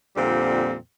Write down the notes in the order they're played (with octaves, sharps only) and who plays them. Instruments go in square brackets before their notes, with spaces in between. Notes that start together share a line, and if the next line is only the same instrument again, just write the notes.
[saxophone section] F2 A#2 D3 G3 C4